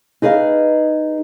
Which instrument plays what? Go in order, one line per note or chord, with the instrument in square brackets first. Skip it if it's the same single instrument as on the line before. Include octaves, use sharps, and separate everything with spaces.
[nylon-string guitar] D#4 G#4 B4 D#5 F5